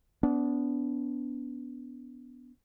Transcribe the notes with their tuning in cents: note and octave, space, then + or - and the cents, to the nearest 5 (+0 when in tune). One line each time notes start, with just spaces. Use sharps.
B3 +5 D4 -30